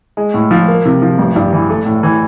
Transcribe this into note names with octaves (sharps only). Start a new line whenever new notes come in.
G#3
A2
F3
A#3
C3
F3
A1
G2
E3
A3
A2
E3